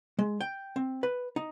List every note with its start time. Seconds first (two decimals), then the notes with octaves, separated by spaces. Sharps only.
0.19 G#3
0.41 G5
0.76 C4
1.03 B4
1.36 D#4